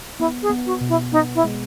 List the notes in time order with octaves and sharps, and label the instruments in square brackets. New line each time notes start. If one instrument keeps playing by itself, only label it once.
[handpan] B3 [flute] E4
[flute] G#4
[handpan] B3
[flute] F#4
[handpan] B2
[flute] E4
[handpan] B3 [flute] D#4
[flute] E4
[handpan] G#3